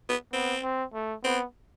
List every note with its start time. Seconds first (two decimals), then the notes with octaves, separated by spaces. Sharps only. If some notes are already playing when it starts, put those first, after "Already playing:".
0.09 B3
0.33 B3 C4
0.63 C4
0.94 A3
1.24 B3 C4